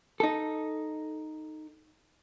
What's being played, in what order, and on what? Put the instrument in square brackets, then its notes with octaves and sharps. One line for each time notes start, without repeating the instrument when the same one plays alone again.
[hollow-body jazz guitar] D#4 A4